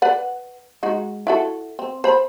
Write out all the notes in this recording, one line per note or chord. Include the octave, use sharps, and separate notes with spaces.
B4 D5 F#5
G#3 D#4 F#4
E4 F#4 A4
C4
C5 B5